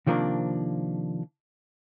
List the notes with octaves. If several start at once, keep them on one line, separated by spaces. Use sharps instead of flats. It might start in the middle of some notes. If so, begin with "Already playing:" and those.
C3 D#3 F3 A#3 C4 D4